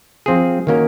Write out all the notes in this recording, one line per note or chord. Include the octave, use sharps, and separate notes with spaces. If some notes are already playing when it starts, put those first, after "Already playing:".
F3 C4 F4 G#4
D#3 A#3 C#4 F#4 A#4